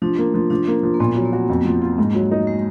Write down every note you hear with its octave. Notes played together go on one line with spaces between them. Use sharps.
F3 D4
A#3
F3
F3 D4
A#3
F3
A#3
A#2 B3
F#3
A#3
F#4
F2
F3
F4
G#2
F#3
D#4
G#3